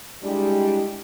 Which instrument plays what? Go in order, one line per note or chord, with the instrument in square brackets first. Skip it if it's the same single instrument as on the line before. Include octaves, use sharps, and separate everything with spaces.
[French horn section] G3 G#3 D4 E4 G4